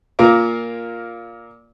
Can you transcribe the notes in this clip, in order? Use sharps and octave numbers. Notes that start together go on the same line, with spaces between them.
A#2 A#3 F4 A#4 D6